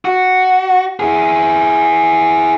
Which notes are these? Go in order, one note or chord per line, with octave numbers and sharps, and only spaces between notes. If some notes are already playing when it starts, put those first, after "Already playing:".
F#4
E4 G#4